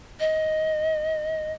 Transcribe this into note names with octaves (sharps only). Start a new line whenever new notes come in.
D#5